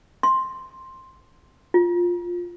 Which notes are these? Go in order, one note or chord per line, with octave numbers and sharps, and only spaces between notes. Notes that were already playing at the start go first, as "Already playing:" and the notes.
C6
F4